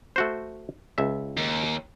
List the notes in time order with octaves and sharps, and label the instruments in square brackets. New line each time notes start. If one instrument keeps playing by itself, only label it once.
[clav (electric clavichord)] A3 F#4 C5
C#2 E5
[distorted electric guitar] D#2